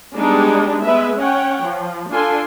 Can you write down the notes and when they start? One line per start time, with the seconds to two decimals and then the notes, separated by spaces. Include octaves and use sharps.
0.16 G3 G#3 B3 D4 D#4
0.84 G#3 B3 B4 E5
1.18 C#4 C#5 F#5 G5
1.64 F3
2.11 D4 F4 A4 G#5 C6